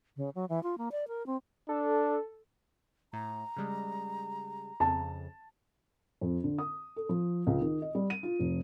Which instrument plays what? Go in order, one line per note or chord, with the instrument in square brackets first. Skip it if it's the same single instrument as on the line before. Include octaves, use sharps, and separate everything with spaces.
[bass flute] C#3
F#3
E3
F4
A#3
D5
A#4
C4
[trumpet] D4 [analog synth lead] A4
[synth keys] A2 [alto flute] A#5
[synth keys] C#3 G3 G#3
[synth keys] F2 C#3 [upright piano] A5
[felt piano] F2
D3
D#6
A4
F3
C#2
D#3
D#5
G3
D#7
F4
F1